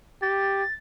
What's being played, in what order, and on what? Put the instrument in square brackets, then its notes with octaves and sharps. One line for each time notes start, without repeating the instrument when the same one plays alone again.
[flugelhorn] G4 [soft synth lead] A6